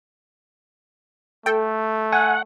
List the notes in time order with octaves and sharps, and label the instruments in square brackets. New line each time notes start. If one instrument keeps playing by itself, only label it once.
[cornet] A3 [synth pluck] A4 G5
[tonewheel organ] F#5 [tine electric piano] G#5